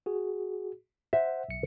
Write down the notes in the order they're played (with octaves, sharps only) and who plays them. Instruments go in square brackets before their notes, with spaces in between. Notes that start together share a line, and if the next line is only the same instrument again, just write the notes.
[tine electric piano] F#4 G#4
[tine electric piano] C5 F#5 [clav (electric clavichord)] E5
[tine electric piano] B1 C#7